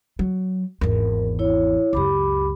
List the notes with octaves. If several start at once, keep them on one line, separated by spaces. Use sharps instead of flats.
F#3
G#1 E2 A#4
E4 C#5
C#2 F#2 G4 B5 D6